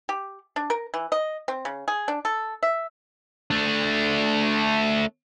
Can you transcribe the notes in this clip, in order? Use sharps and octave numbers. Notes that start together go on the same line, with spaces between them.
G4
D4
A#4
E3
D#5
C4
C#3
G#4
D4
A4
E5
A3 D4